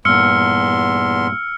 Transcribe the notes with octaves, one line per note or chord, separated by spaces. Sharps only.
E2 G2 A#2 C6 E6 F6 C#7